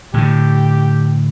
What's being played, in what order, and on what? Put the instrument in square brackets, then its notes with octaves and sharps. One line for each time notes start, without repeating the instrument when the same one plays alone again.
[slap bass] A2 D3 [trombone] G4